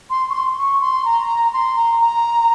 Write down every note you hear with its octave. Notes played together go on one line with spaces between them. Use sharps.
C6
C#6
C6
C#6
C6
A#5
C6
A#5
A#5